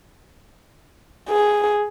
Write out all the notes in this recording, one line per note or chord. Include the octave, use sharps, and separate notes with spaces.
G#4